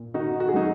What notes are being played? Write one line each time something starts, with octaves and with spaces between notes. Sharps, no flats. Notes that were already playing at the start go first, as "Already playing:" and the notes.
Already playing: A#2
D#3 D#4 F#4
F#4
G#4
F#3 D#4 F#4